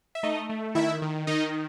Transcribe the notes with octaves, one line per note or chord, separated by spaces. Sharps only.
E5
A3 D#4 D#5
A3
D#3 E4 E5
D#3
D#3 D#4 D#5